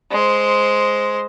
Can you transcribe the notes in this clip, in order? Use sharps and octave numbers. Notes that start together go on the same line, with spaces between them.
G#3 C5